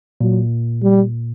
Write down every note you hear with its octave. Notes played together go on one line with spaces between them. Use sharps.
A#2 F#3
G3